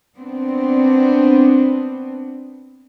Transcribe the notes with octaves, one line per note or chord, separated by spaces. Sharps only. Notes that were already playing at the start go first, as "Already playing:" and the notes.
B3 C4 D4